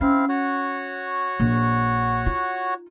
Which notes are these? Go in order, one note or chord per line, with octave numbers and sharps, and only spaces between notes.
C4 C#4 E4 F5
F#4 C#5 F#5
A#1
D#4 F4